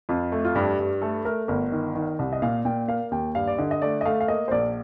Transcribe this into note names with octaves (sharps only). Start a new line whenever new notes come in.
F2 F4
A3
F4
G2 G4
G2
A3 A4
A3 A#4
G1 A#4
D#3
D#3
C2
D#5
A#2 F5
A#2 G5
A#3 F5
D#2 G5
G2 F5
D5
D3 D#5
D#5
A3 D5
D#5
A3 F5
F5
A#3 D#5
C5
A#1 D5